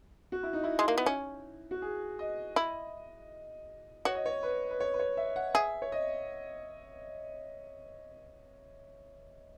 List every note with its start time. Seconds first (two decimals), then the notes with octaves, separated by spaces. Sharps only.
0.32 F#4
0.43 E4
0.53 D#4
0.64 E4
0.79 G#3
0.88 A#3
0.98 B3
1.06 C#4
1.71 F#4
1.82 G#4
2.19 D#5
2.56 E4
4.05 F#4 C#5
4.15 D#5
4.26 C#5
4.43 B4
4.71 B4
4.80 C#5
4.94 B4
4.99 C#5
5.17 E5
5.36 F#5
5.54 G#4 E5
5.82 C#5
5.92 D#5